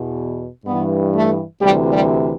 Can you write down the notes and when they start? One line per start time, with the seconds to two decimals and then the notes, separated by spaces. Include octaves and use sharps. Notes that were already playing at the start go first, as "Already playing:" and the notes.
Already playing: E2 B2
0.66 G2 E3 B3
1.14 A3
1.61 D2 C3 E3 G3
1.93 G3